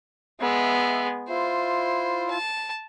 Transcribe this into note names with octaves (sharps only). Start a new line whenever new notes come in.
G#3 B3 E5
E4 F4 C5
A5